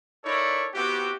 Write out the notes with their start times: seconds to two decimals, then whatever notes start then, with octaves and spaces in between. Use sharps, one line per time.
0.24 D#4 E4 A4 A#4 C#5 D5
0.74 B3 C4 E4 F#4 G4